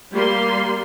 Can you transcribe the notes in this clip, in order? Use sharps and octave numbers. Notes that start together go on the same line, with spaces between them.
G3 A#3 C6